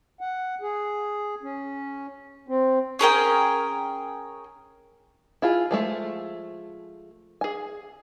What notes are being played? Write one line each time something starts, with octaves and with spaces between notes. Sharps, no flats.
F#5
G#4
C#4
C4
C#4 G#4 A#4 G5
E4 F4 G#4 G#5
F3 G#3 A3
G#4 G#5